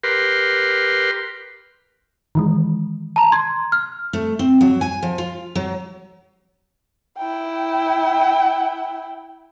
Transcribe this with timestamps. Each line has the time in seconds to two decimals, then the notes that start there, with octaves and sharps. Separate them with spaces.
0.03 G4 A#4 B4 C6
2.35 D#3 E3 G#3
3.16 A5 A#5
3.32 C6 G#6
3.72 F6
4.13 A3
4.39 C4
4.61 F#3
4.81 G#5
5.03 F3
5.18 F4
5.55 F#3
7.18 E4 G5